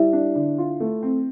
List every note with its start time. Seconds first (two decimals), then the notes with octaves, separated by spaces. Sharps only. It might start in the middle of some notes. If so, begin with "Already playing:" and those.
Already playing: G3 E4 E5
0.13 D4
0.35 D3
0.58 F4
0.80 A3
1.03 C4